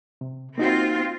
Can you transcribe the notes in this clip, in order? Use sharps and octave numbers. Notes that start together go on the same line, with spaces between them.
C3
A#3 C4 D#4 F4 F#4